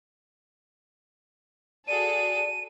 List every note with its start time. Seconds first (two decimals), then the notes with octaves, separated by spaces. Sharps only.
1.88 F#4 G#4 A4 D5 D#7